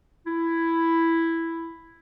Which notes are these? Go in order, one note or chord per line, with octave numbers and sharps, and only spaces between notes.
E4